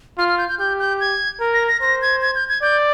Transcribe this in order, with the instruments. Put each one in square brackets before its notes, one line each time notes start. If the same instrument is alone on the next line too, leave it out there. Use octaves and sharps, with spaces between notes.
[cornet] F4 [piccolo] F6
[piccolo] F6
G6
G6
[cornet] G4 [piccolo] G6
[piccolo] G6
G#6
[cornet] A#4
[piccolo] A#6
A#6
[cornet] C5 [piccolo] A#6
[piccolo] G#6
G#6
G6
G#6
[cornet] D5 [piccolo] G6